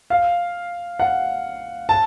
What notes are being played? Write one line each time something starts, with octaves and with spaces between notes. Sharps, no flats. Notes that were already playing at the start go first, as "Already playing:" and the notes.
F5
F#5
A5